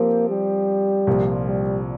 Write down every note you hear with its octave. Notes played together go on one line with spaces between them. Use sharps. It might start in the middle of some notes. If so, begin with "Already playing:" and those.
Already playing: F3 A#3 C4 G4
G3
C2 A#2 F3
G3